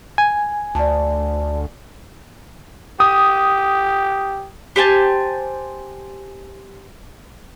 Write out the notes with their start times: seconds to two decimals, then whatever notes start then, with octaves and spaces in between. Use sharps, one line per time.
0.18 G#5
0.75 D2 D5 A5
3.00 G4 D#6
4.76 G4 C5 G#5 A5